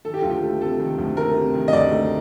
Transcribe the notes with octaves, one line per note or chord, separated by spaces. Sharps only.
D#3 A4
G4
D2 F4
G4
A3
C3 A4
D#3
D2
A3 A#4
C3
D#3
D#5
D2 D5
A3